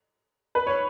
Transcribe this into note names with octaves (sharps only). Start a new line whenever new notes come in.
B4
C#5